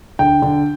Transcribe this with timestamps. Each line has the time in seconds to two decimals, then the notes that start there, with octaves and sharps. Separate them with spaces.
0.19 D3 G5
0.42 D3